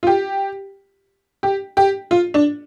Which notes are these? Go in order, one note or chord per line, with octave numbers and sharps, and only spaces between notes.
F4
G4
G4
G4
F4
D4